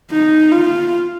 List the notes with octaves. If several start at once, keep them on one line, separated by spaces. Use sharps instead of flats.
D#4
F4